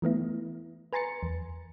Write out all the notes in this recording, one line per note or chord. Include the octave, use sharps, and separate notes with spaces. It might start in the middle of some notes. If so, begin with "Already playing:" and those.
E3 A3 B3 E4
B4 G#5 A#5 C6 A6 C#7
E2